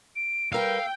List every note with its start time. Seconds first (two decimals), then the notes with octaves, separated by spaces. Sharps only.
0.16 D7
0.52 G3 A#4 B4 F5 G5 E6